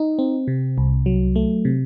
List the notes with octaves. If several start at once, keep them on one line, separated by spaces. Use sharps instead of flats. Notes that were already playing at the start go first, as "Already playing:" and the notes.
Already playing: D#4
C4
C3
C2
F#3
A3
C3